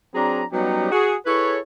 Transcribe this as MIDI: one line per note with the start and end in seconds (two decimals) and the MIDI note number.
0.15 0.44 54
0.15 0.44 60
0.15 0.44 62
0.15 0.44 68
0.15 0.44 82
0.52 0.91 54
0.52 0.91 55
0.52 0.91 59
0.52 0.91 61
0.52 0.91 63
0.52 0.91 67
0.92 1.15 66
0.92 1.15 68
1.26 1.58 64
1.26 1.58 68
1.26 1.58 69
1.26 1.58 71
1.26 1.58 73